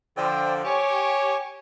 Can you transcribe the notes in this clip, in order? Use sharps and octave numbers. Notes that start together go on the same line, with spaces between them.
D3 F3 C5 D5 G5
G4 C#5 G#5 C#6 D6